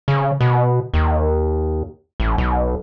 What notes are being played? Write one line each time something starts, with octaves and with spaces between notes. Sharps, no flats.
C#3
B2
D#2
A1
B1